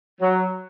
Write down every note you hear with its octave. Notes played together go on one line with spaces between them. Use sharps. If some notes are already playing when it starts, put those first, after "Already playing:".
F#3